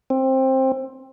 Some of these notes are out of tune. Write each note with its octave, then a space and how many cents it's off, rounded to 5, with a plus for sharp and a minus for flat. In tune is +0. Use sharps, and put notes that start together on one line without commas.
C4 +15